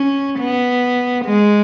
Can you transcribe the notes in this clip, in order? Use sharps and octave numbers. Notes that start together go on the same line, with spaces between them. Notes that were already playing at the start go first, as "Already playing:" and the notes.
Already playing: C#4
B3
G#3